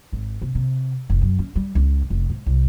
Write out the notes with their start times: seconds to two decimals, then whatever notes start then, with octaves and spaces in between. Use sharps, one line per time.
0.12 G#1
0.42 C3
0.55 C3
1.10 F1
1.21 F#2
1.39 C#4
1.56 G3
1.75 C#2
2.10 F1
2.30 G#2
2.46 C2